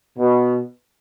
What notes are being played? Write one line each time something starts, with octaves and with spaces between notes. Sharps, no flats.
B2